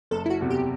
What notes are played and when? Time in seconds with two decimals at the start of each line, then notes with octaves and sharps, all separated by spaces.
0.11 F#1 A4
0.26 E4
0.30 F#4
0.41 E2 C3
0.50 G4